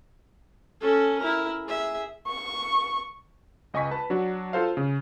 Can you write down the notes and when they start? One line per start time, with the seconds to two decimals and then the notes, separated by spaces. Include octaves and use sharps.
0.81 C#4 A4
1.18 E4 A#4
1.66 G#4 E5
2.28 C#6
3.74 C#2 D#5 G#5 C#6 B6
3.91 B4 A5
4.10 F#3 D4 F#4
4.53 F4 A4 C5 F5
4.77 C#3